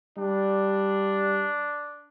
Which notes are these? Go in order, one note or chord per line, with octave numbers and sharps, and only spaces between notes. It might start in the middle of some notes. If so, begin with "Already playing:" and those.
G3 D4